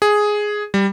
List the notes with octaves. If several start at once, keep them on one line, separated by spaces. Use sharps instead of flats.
G#4
G3